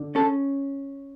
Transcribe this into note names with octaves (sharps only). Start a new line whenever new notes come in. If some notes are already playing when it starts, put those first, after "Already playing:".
Already playing: D3
C#4 A4